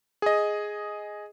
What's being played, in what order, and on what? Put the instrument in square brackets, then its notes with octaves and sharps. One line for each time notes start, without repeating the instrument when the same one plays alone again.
[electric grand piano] G#4 D#5